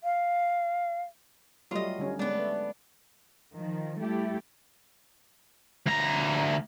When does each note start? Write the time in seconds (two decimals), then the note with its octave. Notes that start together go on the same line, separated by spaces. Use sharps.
0.04 F5
1.71 F#3 G3 A3 F4 D#5
1.99 D3 G3 C#4
2.19 G#3 B3 D4
2.35 A3 B4
3.55 D#3 F3
4.00 G3 A3 E4 G4
5.86 D2 A#5